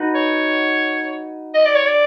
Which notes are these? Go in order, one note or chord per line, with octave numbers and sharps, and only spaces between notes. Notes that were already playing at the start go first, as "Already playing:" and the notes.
Already playing: D#4 F#4 B4
C#5
D#5
D5
C#5
D5